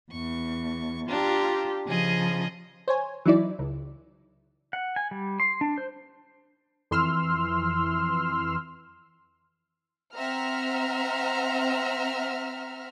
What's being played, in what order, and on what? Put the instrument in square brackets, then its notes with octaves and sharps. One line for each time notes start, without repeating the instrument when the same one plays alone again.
[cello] E2 [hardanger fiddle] C#6
[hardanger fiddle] D4 A#5 [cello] F4 G4
[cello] C#3 F3 [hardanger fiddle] G#4 D#5
[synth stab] C5 C#5 G#5
E3 F#3 D#4 E4 D5
C#2
[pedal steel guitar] F#5
G#5
G3
C6
D4
C5
[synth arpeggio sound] F2 E3 C6 E6 F6
[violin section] C4 E5 F#5 A#5 F6